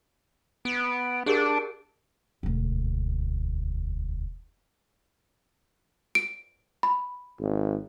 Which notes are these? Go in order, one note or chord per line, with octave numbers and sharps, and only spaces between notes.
B3 D7
D4 G4 G#4 A#4 D7
E1 D2
D7
B5
G#1